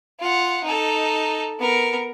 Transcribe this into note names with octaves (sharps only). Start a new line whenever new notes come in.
F4 F#5
D#4 A4
B3 A#4